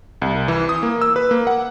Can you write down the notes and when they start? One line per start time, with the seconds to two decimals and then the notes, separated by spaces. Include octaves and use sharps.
0.22 C2
0.48 E3
0.69 D#6
0.83 A#3
1.01 E6
1.16 B4
1.31 A#3
1.47 F#5